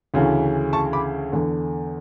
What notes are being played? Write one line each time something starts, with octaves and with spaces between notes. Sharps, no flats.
D2 C#3 E3
A5 C#6
B5 D6
E2 D3